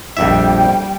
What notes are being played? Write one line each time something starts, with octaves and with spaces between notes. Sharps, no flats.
A#1 F2 G3 E5 G5